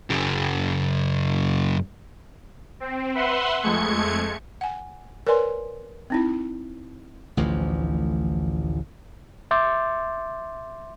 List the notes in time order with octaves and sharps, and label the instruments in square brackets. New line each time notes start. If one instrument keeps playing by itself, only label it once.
[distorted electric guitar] F#2 C#3
[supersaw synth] C4
B4 E5 F#5 C6
F2 G#3 A3 G#6 C#7
[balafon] F#5 G#5
A#4 B4 C#5 D5 G#5 C6
C4 D#4 E4
[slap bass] A1 D2 E3 F3
[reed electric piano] E5 C6 D6 G6 A6